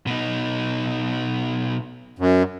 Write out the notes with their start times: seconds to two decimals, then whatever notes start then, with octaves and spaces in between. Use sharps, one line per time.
0.07 B2 D#4
2.19 F#2